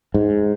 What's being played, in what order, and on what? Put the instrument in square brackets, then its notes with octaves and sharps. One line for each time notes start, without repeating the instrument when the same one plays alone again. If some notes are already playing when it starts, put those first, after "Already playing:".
[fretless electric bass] G#2